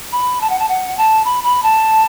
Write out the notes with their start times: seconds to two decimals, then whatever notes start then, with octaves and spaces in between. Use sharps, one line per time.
0.12 B5
0.41 A5
0.50 F#5
0.59 A5
0.68 F#5
0.97 A5
1.25 B5
1.44 B5
1.63 A5